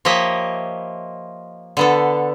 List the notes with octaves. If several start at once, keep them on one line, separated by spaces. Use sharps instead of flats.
F3 A#3 G4 C#5 D#5 E5
D3 B3 A4